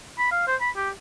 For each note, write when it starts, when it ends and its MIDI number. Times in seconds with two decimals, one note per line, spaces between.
0.19 0.29 83
0.31 0.47 77
0.48 0.56 72
0.61 0.70 83
0.76 0.90 67